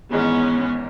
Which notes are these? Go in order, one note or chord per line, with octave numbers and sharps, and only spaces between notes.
G#1 G#2 E3 G#3 B3 C#4